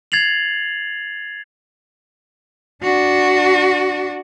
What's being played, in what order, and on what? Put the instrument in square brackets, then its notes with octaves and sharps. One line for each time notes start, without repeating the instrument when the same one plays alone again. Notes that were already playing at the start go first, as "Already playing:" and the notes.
[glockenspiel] G#6 A6 C7 F7 F#7
[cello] D4 F#4